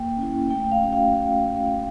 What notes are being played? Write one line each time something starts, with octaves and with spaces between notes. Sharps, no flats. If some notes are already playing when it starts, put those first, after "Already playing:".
Already playing: A#3 G5
C#4
E4
A3 G5
F5
C#4 F#4
F5